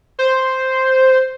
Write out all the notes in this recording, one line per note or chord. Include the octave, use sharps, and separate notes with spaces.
C5